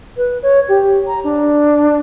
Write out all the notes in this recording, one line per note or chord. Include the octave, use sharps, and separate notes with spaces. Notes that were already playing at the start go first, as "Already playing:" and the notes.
B4
C#5
G4
A#5
D4